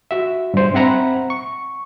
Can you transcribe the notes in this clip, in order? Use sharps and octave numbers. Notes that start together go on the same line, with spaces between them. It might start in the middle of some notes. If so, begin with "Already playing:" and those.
F#4 E5
G2 C5
C4 E5 F#5 A#5 B5
C#6